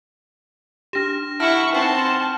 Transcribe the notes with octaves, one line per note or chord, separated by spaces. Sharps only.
D4 G4 F6 A#6 E7
E4 E5 F#5 A5 C#6 F6
C4 D#4 F#5 G5 A5 C6